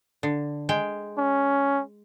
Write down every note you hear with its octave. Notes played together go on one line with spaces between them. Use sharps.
D3
G#3 G5
C#4